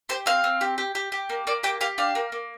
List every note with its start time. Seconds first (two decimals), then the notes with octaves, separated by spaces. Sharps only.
0.09 G4 C5
0.26 C4 F5
0.44 C4
0.61 G4
0.78 G4
0.95 G4
1.12 G4
1.30 A#3
1.47 A#3 D5
1.63 G4 G5
1.81 G4 F5
1.98 D4 F5
2.15 A#3
2.32 A#3